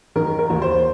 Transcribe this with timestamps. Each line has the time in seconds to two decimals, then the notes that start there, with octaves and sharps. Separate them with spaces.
0.16 D#3 A#4
0.39 A#4
0.50 D#2
0.62 C5